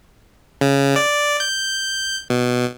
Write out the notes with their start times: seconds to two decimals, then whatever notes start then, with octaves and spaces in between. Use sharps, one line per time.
0.61 C#3
0.96 D5
1.40 G6
2.30 B2